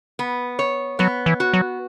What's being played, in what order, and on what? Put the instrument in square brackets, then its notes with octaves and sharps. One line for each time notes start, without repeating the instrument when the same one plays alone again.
[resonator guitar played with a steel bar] B3
C#5
[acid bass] F#3 [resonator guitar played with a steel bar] B3
[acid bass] E3
[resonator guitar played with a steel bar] F#4
[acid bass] F#3